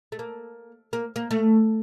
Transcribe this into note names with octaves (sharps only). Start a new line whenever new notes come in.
A3
A#3
A#3
A#3
A3